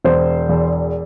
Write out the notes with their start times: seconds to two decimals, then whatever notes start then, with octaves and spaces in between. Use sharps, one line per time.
0.05 E1 C5
0.49 E2